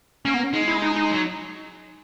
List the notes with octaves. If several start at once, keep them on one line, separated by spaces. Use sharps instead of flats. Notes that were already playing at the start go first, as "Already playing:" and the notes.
A#3 C#4
B3
C#4
G#3 D#4
E4
D#4
D#4
F#3